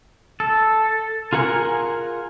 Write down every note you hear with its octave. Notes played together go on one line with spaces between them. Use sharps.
A4
F4 G#4 A#4 F#5 G#5